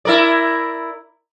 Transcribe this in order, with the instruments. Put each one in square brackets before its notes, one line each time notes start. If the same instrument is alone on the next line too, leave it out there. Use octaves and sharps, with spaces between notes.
[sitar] E4 A#4 D5